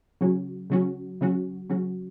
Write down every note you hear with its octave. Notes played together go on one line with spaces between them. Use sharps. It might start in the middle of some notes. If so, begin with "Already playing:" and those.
C#3 F#3 C#4 F#4
C#3 F#3 C#4 F#4
C#3 F#3 C#4 F#4
C#3 F#3 C#4 F#4